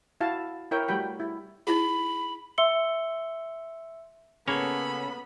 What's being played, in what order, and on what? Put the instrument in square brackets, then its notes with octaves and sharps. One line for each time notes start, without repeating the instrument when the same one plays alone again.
[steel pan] E4 F#4 F5 A5
E4 A#4 C#5 E5 G5
G3 A3 F#4 G5 B5
E4
[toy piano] D#4 E4 G#4 [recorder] B5
[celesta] E5 C6 E6 C#7 G7
[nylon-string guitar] C#3 [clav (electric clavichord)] A#3 C#5 [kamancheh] B3 B5 [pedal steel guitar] C#4 A4